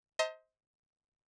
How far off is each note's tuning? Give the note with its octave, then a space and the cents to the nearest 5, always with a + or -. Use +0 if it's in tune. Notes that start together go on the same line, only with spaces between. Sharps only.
C5 +0 D#5 +35 A5 +45